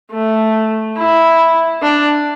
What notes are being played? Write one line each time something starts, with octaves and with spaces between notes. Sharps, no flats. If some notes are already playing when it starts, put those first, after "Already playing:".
A3
E4
D4